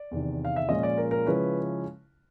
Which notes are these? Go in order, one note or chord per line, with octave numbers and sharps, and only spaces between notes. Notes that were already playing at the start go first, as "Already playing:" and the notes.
Already playing: D5
E2 C3 D#3
F5
E5
A#2 F3 G#3 C#4 F4 D#5
D5
A#4
A#4
C#3 F3 G#3 C#4 E4 B4